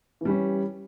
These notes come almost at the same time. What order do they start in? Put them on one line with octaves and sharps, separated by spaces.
E3 G3 C#4